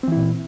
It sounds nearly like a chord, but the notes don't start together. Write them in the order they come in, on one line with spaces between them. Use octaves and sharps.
C4 E3 E4 A#2